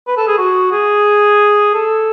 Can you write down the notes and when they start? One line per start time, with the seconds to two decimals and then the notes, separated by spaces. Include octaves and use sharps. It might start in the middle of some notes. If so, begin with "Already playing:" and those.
0.08 B4
0.17 A4
0.27 G#4
0.38 F#4
0.72 G#4
1.74 A4